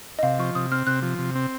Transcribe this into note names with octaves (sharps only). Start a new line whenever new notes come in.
D#5
C3 F5
F3 C#6
C3 D#6
C4 F6
C3 F#6
F3
C3
C4